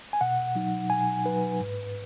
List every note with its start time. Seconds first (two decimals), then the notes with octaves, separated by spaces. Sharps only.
0.13 G#5
0.21 B2 F#5
0.55 F#3 D#4
0.90 B2 G#5
1.24 F#3 D#4 B4
1.60 G#2